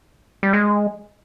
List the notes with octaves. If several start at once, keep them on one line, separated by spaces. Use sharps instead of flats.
G3
G#3